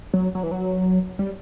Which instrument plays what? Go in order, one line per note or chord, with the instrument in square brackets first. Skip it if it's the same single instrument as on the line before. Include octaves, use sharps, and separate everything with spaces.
[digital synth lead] F#3
F#3
E3
F#3
G3